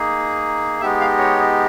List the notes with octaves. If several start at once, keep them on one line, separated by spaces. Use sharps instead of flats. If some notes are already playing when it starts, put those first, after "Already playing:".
Already playing: A#3 D#4 G#4
G#3 B3 D#4 G4 E5
F5
C#5